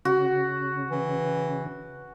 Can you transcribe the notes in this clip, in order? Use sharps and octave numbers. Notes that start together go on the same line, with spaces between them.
C#3 F#4
E3